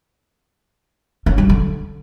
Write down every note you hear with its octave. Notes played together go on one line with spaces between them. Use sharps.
C#4
G3
D3